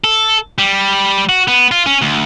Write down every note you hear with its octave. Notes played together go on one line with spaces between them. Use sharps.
A4
G3
F#4
B3
F4
C#4
D2